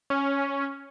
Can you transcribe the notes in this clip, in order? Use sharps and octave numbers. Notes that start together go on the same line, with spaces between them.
C#4